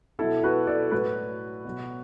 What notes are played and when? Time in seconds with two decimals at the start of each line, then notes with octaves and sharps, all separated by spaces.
0.19 B2 F#3 E4 A4
0.44 F#4 B4
0.67 A4 D5
0.91 A2 F#3 F#4 B4
1.65 B2 F#3